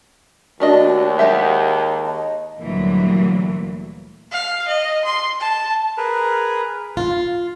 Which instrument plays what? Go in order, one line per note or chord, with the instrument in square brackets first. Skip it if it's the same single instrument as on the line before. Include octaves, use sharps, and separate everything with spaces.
[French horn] D#2 [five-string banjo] A3 D4 D#5 [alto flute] F#4
[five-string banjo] G#3 G4 E5 [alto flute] F#5
[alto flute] A5
D#5
[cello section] D2 A#2 E3 F#3 G3 A#3
[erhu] F5
D#5
C6
A5
[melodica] G#4 A#4 B4
[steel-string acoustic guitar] F4